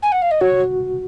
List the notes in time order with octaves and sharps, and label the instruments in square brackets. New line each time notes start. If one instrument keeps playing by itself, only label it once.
[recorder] G#5
F#5
F5
D#5
[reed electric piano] F#4 [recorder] C#5